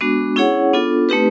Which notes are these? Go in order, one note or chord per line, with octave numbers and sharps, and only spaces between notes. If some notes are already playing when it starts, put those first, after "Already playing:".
G#3 B3 D4 F#4
C#4 E4 G#4 C#5 F#5
B3 D4 F4 A4
A3 C4 D#4 G4 B4